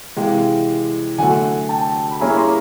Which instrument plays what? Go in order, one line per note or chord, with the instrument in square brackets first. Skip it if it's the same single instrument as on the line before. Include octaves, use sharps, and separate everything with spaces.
[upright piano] C3 E3 G#3 [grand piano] F5 G5
[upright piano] D3 F#3 A3 [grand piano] F#5 G#5
[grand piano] G5 A5
B5
[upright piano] G3 A#3 C#4 E4 G#4 [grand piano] G#5 A#5
[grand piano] A#5 C6